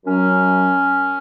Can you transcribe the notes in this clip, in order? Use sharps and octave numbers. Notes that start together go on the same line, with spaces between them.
F#2 F#3 C#4